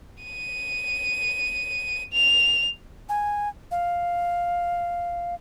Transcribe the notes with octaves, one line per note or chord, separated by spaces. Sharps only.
D#7
F7
G#5
F5